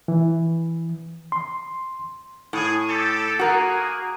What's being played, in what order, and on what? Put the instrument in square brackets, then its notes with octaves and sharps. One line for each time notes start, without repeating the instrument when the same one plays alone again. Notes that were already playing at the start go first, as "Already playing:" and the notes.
[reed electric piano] E3
C6
[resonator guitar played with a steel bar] A2 [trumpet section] G#4
[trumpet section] G4 A4
[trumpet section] A#3 G#4 [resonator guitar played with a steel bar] F#4 A#4